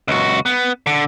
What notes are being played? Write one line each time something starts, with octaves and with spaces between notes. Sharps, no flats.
C#2 F#4
B3
D3